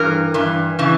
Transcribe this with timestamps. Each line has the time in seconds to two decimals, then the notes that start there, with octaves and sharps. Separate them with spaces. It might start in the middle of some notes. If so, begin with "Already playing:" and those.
Already playing: G2 E3 A#4
0.34 G2 E3
0.79 C#3 E3